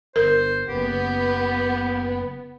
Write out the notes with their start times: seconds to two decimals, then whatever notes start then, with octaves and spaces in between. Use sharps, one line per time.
0.16 G1 A#4 C5
0.69 F#1 B3 G4